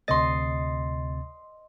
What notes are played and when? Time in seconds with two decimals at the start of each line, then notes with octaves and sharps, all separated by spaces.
0.08 D2 C3 D#5 C6 A6